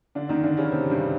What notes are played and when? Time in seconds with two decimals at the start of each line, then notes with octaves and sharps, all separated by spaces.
0.15 D3 D4
0.29 D#3 D#4
0.44 D3 D4
0.57 C#3 C#4
0.72 C3 C4
0.90 G2 G3